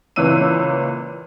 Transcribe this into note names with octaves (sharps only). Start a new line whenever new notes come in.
C#2 A#2 E3 C#4 E6 D#7